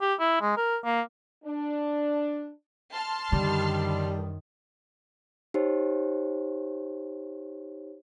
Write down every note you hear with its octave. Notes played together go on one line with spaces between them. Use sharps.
G4
E4
G#3
A#4
A#3
D4
A5 C6 F6
F#2 D3 D#3 G3
D#4 G4 C5 C#5